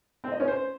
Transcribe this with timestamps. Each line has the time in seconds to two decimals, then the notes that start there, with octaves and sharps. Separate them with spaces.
0.24 C4
0.32 D#5
0.40 C#4
0.48 C5